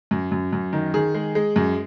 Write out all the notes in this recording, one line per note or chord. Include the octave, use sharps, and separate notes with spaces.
F#2
F#2
F#2
D#3
D#3 G#4
G#3
G#3
F#2